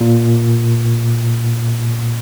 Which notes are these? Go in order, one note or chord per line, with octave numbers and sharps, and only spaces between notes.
A#2